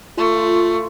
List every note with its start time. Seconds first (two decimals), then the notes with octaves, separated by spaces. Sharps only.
0.17 A3 F4